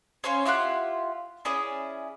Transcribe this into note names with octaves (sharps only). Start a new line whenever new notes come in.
C#4 C5 C#5 F5
E4 F4 G4 F#5
C#4 E4 G#4 D5